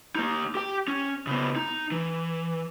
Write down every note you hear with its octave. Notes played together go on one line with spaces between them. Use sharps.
A#3 D#4
G4 G5
C#4
C#3 B3
D#4
E3